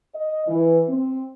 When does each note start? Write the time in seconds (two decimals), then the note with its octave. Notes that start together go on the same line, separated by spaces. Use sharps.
0.15 D#5
0.48 E3
0.89 C4